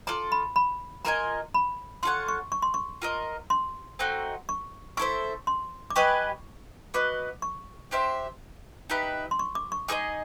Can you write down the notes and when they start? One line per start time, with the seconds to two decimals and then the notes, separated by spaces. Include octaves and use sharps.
0.07 F4 A4 D5 A#5
0.32 B5
0.56 B5
1.05 F4 A#4 D#5 G#5 A#5
1.54 B5
2.03 F4 A4 C#5 F#5 C6
2.28 C#6
2.52 C#6
2.62 C6
2.74 C#6
3.02 F4 A#4 D#5
3.50 C6
3.99 A3 C4 D#4 F#4
4.49 C#6
4.97 E4 A4 C5 E5 C#6
5.47 C6
5.90 D6
5.96 G4 B4 D#5 G#5 C#6
6.94 F#4 B4 D#5 D6
7.42 C#6
7.91 D4 G4 C5 E5
8.90 D#4 G4 B4 E5
9.31 C6
9.39 C#6
9.55 D6
9.72 C#6
9.88 D#4 G#4 C5 D#5 D6